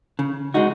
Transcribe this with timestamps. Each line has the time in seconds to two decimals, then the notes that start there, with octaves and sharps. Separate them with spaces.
0.19 C#3
0.54 G#3 D#4 F#4